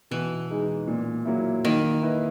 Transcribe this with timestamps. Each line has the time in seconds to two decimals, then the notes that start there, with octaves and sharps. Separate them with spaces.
0.11 B2 E3
0.50 G#3 D#4
0.87 A#2
1.25 F#3 A#3 E4
1.65 D#3 A#3
2.02 E4 B4 D#5